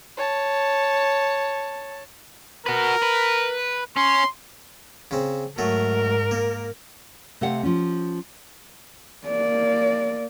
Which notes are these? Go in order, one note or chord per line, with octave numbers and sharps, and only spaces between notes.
C#5 A5
F#4 A#4 B4
B4
C#4 C6
C#3 C4
G#2 F#3 A3 A#4
A#3
C3 A3 C5 F5 F#5
F3 C#4
A#3 D5